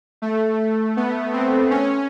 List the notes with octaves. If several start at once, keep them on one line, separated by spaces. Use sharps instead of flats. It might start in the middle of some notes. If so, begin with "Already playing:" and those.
A3
B3
C4
C#4